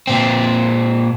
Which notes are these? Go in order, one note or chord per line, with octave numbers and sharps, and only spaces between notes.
A#2 C4